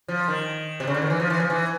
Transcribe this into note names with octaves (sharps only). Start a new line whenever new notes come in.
F3
D#3
C3
C#3
D3
D#3
E3
F3
E3
F3
E3